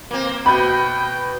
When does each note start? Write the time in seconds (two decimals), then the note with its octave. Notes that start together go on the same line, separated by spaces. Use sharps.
0.11 A#3 C4
0.46 B2 G5 B5 G6